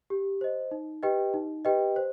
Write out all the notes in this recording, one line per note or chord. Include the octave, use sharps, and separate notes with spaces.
G4
C5 D#5
D#4
G4 B4 D#5 G5
D#4
G4 B4 D#5 G5
C5